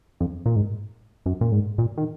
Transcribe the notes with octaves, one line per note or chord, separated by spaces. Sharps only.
F2
A#2
G#2
F#2
A#2
G#2
A#2
D#3